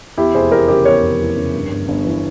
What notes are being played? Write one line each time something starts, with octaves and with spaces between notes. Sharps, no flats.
E2 E4 G4
F1 G#4 C5
E3 G4 A#4
C#3 G4 A#4
E2 A#4 C#5
F1
E3
C#3
G2
G1
G1
E3